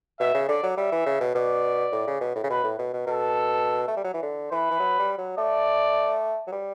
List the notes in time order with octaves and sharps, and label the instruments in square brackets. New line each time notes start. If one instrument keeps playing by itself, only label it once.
[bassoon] B2 [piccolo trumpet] E5
[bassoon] C#3
[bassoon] D3 [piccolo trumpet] D5
[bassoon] F#3
[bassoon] G3 [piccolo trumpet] E5
[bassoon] E3
C#3
B2
[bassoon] B2 [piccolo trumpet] D5
[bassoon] A2
C#3
B2
A2
C#3
[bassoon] B2 [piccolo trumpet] B4
[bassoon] A2
B2
B2
[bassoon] B2 [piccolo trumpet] A4
[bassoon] A3
G3
F#3
E3
D3
[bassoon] E3 [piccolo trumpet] B4
[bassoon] E3
F#3
G3
F#3
[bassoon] A3 [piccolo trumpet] D5
[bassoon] F#3
G3